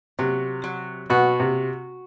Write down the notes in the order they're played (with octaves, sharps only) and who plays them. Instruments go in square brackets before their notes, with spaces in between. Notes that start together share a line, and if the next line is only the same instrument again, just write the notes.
[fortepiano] C3 [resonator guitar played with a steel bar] F#3
[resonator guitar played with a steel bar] F#3
[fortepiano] B2 [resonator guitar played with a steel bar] F#4
[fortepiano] C3